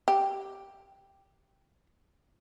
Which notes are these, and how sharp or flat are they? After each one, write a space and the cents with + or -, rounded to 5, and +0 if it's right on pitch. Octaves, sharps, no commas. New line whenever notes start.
G4 +0